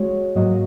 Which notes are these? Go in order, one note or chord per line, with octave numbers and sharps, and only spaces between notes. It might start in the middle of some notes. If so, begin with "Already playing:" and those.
Already playing: G#3 F#4 C#5
G#2 F#3 A#3 F#4 D#5